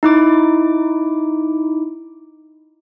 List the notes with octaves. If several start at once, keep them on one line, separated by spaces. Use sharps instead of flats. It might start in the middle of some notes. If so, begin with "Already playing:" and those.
D#4 E4 D6